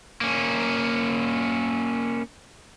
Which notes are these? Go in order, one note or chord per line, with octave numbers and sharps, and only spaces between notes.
A#3 C#4